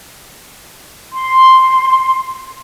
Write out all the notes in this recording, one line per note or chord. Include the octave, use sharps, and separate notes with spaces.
C6